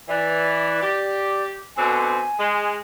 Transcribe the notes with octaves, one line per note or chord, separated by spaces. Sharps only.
E3 D5
G4
B2 D3 C4 G#5
G#3